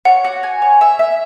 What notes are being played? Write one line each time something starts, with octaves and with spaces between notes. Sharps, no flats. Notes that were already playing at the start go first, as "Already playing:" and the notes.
C#5 F#5
F#4
G#5
C#5
E5
E5